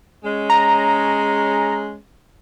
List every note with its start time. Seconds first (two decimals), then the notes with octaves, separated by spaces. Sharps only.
0.24 G#3 C#4
0.50 A#5